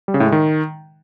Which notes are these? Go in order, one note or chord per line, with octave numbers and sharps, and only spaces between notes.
G3
C#3
A2
G#3
D#3